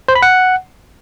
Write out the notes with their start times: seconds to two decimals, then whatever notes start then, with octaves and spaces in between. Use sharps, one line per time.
0.08 C5
0.15 B5
0.22 F#5